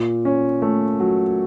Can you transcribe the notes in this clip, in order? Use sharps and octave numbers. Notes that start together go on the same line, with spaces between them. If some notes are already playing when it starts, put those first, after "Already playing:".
Already playing: A#2
C#4
A3
F#3